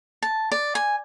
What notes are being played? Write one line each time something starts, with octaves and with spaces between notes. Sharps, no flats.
A5
D5
G#5